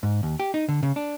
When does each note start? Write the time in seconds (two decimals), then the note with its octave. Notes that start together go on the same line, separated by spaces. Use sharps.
0.03 G#2
0.23 D#2
0.40 G4
0.54 D#4
0.68 D3
0.83 C#3
0.96 D4